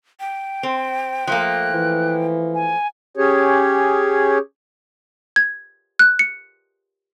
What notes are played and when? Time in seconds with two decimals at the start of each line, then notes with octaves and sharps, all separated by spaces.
0.20 G5
0.63 C4
1.27 F3 A3 A#3 F#6
1.72 E3
2.55 G#5
3.17 C#4 G4 G#4 C#5
5.36 G#6
5.99 F#6
6.19 C#7